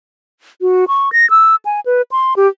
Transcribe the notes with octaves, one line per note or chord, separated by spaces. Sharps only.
F#4
C#6
A#6
E6
G#5
B4
C6
G4